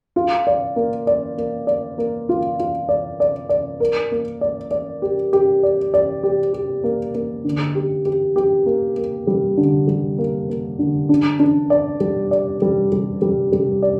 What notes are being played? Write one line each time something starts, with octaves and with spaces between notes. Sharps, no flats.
F4
D5
A#3
D5
A#3
D5
A#3
F4
F4
D5
D5
D5
A#4
A#3
D5
D5
G4
G4
D5
D5
G4
G4
A#3
A#3
D3
G4
G4
G4
A#3
A#3
G3
D3
G3
A#3
A#3
D3
D4
D4
D5
G3
D5
G3
G3
G3
G3
D5